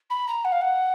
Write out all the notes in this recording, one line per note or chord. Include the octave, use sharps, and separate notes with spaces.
B5
A#5
F#5
F5
F#5